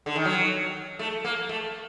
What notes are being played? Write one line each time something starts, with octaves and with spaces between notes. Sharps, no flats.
D3
D#3
F#3
A3
A#3
A3